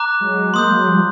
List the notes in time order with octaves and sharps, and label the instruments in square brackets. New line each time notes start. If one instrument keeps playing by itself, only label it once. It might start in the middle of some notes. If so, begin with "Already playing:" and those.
Already playing: [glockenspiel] A#5 D6 F#6
[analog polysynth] F#3 G#3
[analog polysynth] G#3 A#3 [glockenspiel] C6 D#6 G6
[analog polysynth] F#3 G#3
F3 G3